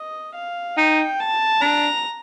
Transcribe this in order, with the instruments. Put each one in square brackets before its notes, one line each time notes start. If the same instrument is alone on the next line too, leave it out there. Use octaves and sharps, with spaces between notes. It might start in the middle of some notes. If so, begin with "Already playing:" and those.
Already playing: [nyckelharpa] D#5
F5
[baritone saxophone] D#4 [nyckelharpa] G5
[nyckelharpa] A5
[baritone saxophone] D4 [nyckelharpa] A#5